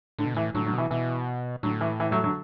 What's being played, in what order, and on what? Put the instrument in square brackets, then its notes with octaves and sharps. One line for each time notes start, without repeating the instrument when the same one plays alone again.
[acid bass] A2 [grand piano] D3
[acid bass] B2
[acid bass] A2 [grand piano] E3
[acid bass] A2 [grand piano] D3 F#3
[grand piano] D3 F#3
[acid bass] B2
[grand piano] E3
[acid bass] B2 [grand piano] E3
[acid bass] A2 [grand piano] D3 F#3
[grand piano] E3
E3
F#3 A3
D3 F#3